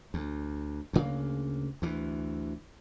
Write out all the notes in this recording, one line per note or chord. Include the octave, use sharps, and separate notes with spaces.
D2
D2 C#3 A#3
D2 E3